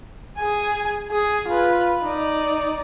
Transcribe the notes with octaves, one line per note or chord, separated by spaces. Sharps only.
G#4 G#5
G#4
F4 B4
D#4 D5